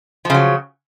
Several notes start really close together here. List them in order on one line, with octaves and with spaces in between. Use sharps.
F3 C#3 F#3